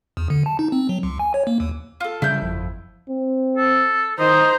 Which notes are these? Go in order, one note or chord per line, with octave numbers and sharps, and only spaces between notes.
E2
D3
A5
D#4
C4
F#3
C#2
G#5
C#5
A#3
D#2
F4 A4
C#3 G3 E4 G6
G1 F2
C4
A4
D#3 C5 D#5 A#5